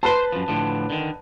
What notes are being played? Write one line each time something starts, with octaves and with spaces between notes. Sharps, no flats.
B4 C5 A5 C6
F#2 F3
A2 D3 F3
D3 D#3